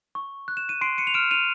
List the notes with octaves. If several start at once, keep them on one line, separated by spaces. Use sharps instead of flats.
C#6
F#6
E7
D#7
C6 C7 D7
C#7 D#7
F7
F6 D7 E7
D#7 F7